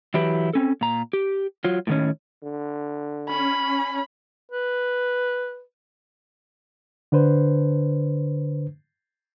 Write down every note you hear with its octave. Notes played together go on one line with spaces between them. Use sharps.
E3 F#3 E4 G4 B4
C4 C#4 A4
A#2 A#5
G4
F#3 F4
A2 D#3 C#4
D3
C#4 B5
B4
D3 D4 B4 C5